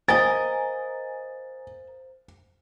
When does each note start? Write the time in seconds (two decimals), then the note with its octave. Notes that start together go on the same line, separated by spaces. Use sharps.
0.08 A#4 C5 D#5 F5 G#5 A6